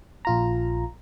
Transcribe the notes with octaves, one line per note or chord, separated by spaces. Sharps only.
A#1 F4 A#5